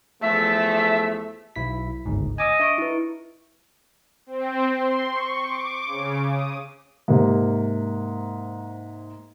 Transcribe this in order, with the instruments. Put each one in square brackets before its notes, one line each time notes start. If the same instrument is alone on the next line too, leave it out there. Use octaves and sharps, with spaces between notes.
[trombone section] E2 F3 A3 [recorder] E5
[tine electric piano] B1 E4 B6
G1 C#2 G#2
[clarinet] D#5 [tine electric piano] G#5 D6 E6
[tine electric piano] D4 [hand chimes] E5 C#6 D7
[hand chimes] E4 B4
[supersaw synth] C4
C6
C#6
D6
C#3
D#6
[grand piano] G#2 C3 A#3